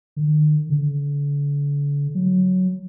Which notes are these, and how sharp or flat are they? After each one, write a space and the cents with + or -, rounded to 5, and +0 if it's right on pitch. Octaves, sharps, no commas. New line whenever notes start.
D#3 -45
D3 -40
F#3 +0